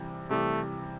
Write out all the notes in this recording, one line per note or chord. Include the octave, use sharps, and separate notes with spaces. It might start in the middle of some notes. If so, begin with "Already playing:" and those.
Already playing: C3 E3 G3
C3 E3 G3 A3